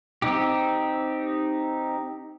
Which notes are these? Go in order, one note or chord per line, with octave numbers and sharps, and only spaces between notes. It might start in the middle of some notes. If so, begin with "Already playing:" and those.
C4 D#4 G4